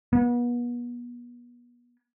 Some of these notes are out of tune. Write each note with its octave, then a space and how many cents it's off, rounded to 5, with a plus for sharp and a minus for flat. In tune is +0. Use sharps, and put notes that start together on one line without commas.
B3 -35